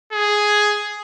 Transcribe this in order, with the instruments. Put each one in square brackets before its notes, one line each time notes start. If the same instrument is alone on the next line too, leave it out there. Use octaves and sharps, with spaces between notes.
[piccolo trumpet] G#4